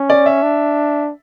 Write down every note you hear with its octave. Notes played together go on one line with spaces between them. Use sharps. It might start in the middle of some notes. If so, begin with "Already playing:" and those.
Already playing: C#4
D5
E5
D4